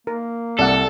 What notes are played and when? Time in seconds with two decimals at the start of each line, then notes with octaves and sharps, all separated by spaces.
0.07 A#3 A#4
0.59 C2 A4 D5 F#5